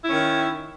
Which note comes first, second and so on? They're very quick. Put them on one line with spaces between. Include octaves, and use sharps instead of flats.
E4 C#4 D#3